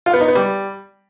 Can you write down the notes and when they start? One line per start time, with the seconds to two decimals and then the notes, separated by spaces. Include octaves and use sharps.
0.06 F4
0.14 B3
0.21 D#4
0.28 B3
0.35 G3